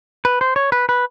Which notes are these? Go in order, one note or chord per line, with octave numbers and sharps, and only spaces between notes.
B4
C5
C#5
B4
B4